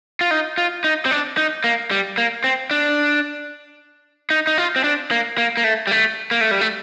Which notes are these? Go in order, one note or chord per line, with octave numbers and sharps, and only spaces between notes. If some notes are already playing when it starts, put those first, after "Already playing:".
F4
D#4
F4
D#4
C4
D4
D#4
A#3
G3
A#3
C4
D4
D#4
D#4
F4
C4
D4
A#3
A#3
A#3
A3
G3
A3
A#3
A3
G3
A3